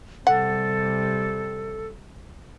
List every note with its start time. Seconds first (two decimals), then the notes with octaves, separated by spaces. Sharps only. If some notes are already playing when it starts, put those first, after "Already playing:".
0.27 C3 G3 A4 F#5